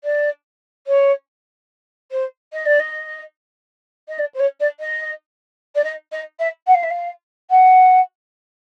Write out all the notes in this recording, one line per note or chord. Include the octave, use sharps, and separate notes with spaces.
D5
C#5
C5
D#5
D5
D#5
D#5
D5
C5
C#5
D5
D#5
D5
D#5
D#5
E5
F#5
F5
E5
F5
F#5